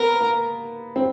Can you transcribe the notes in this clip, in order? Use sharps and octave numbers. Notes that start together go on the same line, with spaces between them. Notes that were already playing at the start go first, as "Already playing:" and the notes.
Already playing: B3 A#4
A#3
C4